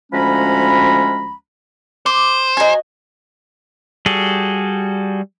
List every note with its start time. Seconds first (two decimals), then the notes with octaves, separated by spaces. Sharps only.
0.12 D2 F3 G#3 C#4 A#5 B5
2.06 C5 D6
2.57 F#4 D#5 G#5 A#5
4.06 G3 F#4 G#4 A4